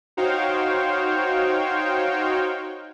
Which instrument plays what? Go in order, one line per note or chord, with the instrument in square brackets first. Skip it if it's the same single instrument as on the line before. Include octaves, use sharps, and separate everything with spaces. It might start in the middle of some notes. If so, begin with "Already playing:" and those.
[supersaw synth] D#4 F#4 C5 C#5 F5 G5